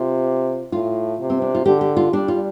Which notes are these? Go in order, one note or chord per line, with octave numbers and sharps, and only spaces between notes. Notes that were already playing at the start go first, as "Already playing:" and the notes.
Already playing: C3 F4
A2 F4
C3
C4
D4
F4
D3 G4
G4
F4
G3 D4
F4